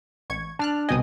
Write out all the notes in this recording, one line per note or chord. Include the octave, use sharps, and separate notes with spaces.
A1 C#6 G#6
D4 A5 F6 F#6
C2 B2 D#5 G5 G#5 D#6